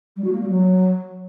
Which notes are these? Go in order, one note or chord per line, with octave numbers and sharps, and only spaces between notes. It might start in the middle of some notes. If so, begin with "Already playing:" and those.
G3
F#4
A#3
G3
F#3